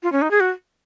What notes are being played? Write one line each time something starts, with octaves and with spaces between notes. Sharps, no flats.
F4
C#4
D#4
G#4
F#4